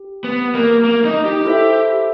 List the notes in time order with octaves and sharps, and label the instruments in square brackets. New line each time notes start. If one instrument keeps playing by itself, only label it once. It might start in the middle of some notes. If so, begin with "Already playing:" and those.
Already playing: [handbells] G4
[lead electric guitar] B3
A#3
A#3
D#4
G4
[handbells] E4 A4 C5 E5